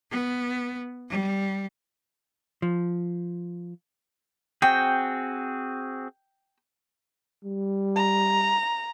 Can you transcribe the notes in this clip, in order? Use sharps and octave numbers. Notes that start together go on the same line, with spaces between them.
B3
G3
F3
C4 F#4 G#4 G5
G3
A#5